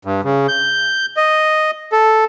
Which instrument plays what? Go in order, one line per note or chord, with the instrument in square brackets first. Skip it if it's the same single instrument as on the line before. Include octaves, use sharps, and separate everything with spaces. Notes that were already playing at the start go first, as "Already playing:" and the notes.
[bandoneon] G2
C#3
G6
D#5
A4